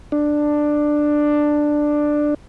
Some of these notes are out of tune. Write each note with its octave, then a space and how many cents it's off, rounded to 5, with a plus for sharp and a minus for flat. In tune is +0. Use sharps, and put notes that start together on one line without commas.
D4 +10